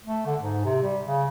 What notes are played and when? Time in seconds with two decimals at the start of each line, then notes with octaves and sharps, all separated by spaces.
0.05 A3
0.26 D3
0.40 G#2
0.65 C3
0.82 G3
1.05 C#3